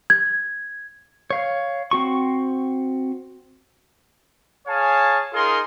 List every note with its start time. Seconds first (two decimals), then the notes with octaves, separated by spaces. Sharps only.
0.10 G#6
1.30 C#5 F5
1.91 C4 F#4 C#6
4.68 G#4 C#5 F5 G#5 A5
5.33 D#4 F4 G#4 A#4 C6